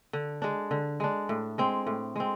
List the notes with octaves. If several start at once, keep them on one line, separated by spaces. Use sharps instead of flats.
D3
G#3 D4
D3
G#3 D4
A2
G#3 C4
A2
G#3 C4